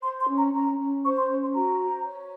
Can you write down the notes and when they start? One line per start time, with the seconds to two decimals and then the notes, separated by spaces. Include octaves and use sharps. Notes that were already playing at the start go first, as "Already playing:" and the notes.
0.03 C5 C6
0.20 C6
0.28 C#4
0.36 A#5
0.53 C#4 A#5
0.79 C#4
1.03 C5 C#6
1.17 C6
1.28 C#4
1.41 C6
1.54 F#4 A#5
1.79 C5
2.04 C#5